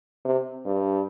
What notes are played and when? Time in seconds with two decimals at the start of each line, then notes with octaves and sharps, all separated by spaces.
0.25 C3
0.65 G2